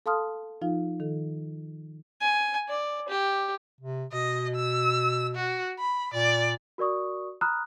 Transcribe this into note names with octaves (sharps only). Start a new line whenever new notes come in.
A4 F5 A5 C6 D#6 F6
F3 D#4 F4 F5
D#3 A4
G#5
D5
G4
C3
B2 D#5
E6
F#4
B5
A#2 D5
F#4 A#4 D5 C#6 D#6
A#5 B5 D#6 F6 F#6